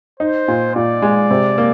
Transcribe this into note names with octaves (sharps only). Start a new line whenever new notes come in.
D#4 C5
A#2
A#2 D5
G#3
C3
A#3